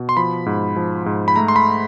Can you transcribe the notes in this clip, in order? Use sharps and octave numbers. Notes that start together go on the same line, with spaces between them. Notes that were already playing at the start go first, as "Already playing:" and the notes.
Already playing: B2
C6
F3 B5
G#2
F3
G#2
B5
A3 A#5
C6
B5